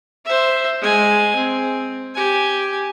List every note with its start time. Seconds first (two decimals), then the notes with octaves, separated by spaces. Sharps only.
0.25 C5 E5
0.81 G#3 G#5
1.35 C4
2.15 G4 G#5